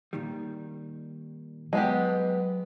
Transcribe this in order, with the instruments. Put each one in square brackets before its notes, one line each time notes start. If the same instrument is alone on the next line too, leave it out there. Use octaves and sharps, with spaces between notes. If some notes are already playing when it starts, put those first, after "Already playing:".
[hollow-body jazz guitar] A#2 D#3 G3
[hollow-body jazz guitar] F#3 D#5 G#5 [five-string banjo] G#3 B3 G4